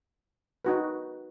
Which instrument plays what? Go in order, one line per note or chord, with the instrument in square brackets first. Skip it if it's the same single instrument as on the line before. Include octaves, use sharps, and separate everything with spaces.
[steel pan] D#4 F#4 B4